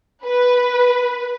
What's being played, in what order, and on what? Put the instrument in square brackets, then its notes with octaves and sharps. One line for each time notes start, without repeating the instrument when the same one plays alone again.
[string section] B4